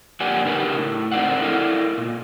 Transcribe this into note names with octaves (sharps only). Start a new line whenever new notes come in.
F2 A#3 G4 D5 F#5 G#5
C#3 D4 D#4 G4 A#4 B4
A2
C4 D#4 A#4 D5 F5 F#5
E4 A4 A#4 D5 D#5 F5
A#2